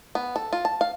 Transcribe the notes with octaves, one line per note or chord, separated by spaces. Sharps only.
B3
A4
F4
A5
F5